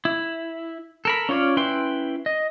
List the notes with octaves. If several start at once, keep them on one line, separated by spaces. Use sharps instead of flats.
E4
A4 A#4 B5
C#4 F4 C#5 D5 F5
C#4 E4 B4 G5 C6
D#5